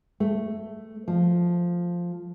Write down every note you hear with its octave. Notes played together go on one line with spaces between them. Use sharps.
A3
F3